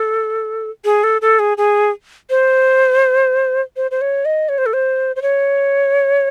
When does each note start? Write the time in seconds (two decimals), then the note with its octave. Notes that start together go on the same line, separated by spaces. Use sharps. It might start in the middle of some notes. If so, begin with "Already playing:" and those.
Already playing: A4
0.85 G#4
1.04 A4
1.21 A4
1.39 G#4
1.57 G#4
2.30 C5
3.77 C5
3.91 C5
4.01 C#5
4.25 D#5
4.49 C#5
4.58 C5
4.66 A4
4.73 C5
5.16 C5
5.22 C#5